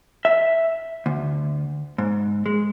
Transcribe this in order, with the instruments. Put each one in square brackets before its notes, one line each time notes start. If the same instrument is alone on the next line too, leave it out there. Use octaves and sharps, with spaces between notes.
[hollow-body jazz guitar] E5
D2
G#2
G#3